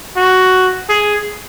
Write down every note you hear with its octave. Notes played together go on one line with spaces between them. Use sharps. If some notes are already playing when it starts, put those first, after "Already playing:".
F#4
G#4